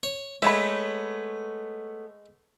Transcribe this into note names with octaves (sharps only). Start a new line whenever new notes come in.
C#5
G#3 A3 B3 C#5 E5 B5